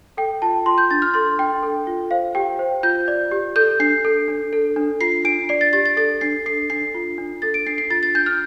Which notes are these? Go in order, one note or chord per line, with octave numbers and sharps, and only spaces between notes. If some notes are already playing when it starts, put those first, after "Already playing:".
A4 G5
F4 A5
F4 C6
G6
D4 A6
F6
A4 C6
D4 G5
A4
F4
C5 F5
G4 G5
C5
F4 G6
D5
G4
A4 G6
D4 C7
A4
D4
A4
D4
F4 C7
D4 D7
D5 C7
A6
G4 A6
A6
A4 A6
D4 C7
A4 C7
D4 C7
F4
D4
A4 A6
D7
D4 C7
C7
F4 A6
A6
D4 G6
F6